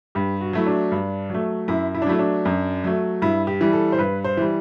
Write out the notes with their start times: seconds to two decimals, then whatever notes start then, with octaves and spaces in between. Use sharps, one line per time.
0.15 G2 G4
0.41 F#4
0.53 F#3 A3 E4
0.67 D4
0.92 G2
1.30 F#3 A3
1.68 F#2 E4
1.94 E4
2.02 D4
2.07 F#3 A3 E4
2.19 D4
2.45 F#2
2.84 F#3 A3
3.22 G2 E4
3.47 G4
3.61 E3 G3
3.73 A4
3.92 C5
3.98 G2 B4
4.24 C5
4.37 E3 G3